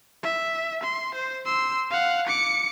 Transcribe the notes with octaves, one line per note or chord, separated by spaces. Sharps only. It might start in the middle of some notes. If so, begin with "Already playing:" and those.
E5
C6
C5
C6 E6
F5 F#5
D6 C#7